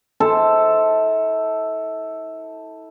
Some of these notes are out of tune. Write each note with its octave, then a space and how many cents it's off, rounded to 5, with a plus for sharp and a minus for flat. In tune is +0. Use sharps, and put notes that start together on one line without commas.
E4 -40 A4 +0 C5 +0